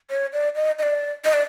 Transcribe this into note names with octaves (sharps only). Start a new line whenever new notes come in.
C#5
D5
D#5
D#5
D5
D#5
D5